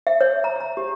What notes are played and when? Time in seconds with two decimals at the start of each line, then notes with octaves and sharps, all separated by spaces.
0.07 E5
0.21 C#5
0.44 A#5
0.60 A#5
0.77 G4